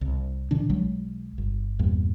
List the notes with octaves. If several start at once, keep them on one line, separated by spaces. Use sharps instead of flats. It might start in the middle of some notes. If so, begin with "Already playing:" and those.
C2
A#2 D3 E3 D4
B1 F#3 G#3
G1
E2 G2 A#2